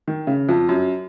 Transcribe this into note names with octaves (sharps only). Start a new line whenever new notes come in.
D#3
C#3
F2
F#2